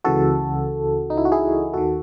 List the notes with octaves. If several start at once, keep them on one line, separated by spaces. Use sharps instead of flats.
C#2 C#3 E3 F#4 A4
D#4
E4
F#4
E4 G#4
D#2 D#3 F#4 A4